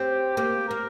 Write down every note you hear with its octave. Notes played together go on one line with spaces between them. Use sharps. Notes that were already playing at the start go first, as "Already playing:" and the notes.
Already playing: C4 G4
A#3 G4
A#3 A#4